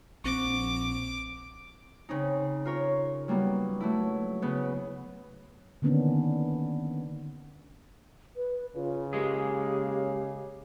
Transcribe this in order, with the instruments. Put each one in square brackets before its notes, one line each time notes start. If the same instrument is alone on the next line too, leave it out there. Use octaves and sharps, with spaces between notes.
[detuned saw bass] A#1 [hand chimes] C4 C#6 [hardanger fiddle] D6
[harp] C#3 C4 C#4 D#4
F4 A#4 C#5
F#3 G3 A#3 B3
F#3 A3 E4
C#3 B3 G#4
[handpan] D3 D#3 A#3 B3 C#4 D4
[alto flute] B4
[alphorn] C#3 [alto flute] F4
[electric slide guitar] G#3 A#3 G#4 [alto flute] G4